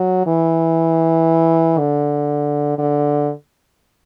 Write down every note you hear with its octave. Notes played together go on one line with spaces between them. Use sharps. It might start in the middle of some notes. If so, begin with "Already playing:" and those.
Already playing: F#3
E3
D3
D3